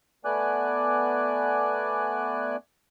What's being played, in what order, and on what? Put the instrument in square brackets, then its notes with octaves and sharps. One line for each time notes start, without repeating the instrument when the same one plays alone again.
[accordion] A3 B3 D5 G#5 D6 F#6